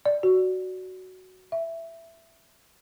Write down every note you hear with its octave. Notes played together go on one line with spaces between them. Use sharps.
D5
F#4
E5